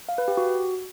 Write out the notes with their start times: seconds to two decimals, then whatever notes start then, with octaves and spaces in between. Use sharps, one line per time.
0.09 F5
0.18 B4
0.28 G4
0.37 F#4